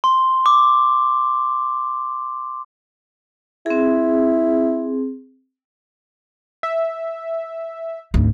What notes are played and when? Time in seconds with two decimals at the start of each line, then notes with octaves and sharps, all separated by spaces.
0.04 C6
0.46 D6
3.66 C4 E4 G#4
6.63 E5
8.14 G#1 D2